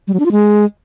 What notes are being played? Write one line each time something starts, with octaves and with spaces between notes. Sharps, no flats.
G3
F#3
D4
F4
G#3